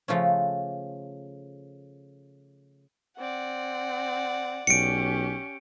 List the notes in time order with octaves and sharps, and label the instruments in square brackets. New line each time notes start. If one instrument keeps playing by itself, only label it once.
[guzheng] C#3 F3 A3 C#4
[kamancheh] C4 [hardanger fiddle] D5 F#5
[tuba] B1 [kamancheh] C#4 G4 [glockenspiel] C#7 D7